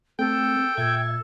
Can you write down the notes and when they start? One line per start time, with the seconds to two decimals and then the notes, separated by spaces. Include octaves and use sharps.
0.19 A3 C4 A4 G5
0.77 A#2 A4 E5 G#6